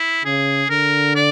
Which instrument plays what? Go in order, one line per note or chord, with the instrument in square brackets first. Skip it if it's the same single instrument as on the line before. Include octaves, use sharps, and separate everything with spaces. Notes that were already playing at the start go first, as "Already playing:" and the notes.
Already playing: [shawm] E4
[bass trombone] C#3 [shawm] G#4
[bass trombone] D3 [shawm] A#4
[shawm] D5